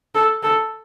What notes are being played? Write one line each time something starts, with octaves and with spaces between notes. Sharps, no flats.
A4
A4